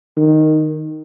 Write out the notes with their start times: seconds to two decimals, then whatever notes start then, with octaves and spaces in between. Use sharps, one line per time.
0.17 D#3